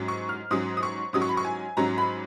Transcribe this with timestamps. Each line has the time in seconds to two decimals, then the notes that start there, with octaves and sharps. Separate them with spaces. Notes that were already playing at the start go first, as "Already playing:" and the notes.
Already playing: G#2 F#3 C#4
0.08 C#6
0.29 F6
0.51 G#2 F#3 C#4 D#6
0.77 D#6
0.83 C#6
1.13 G#2 F#3 C#4 D#6
1.22 C#6
1.29 B5
1.37 C#6
1.45 G#5
1.77 G#2 F#3 C#4 A#5
1.98 B5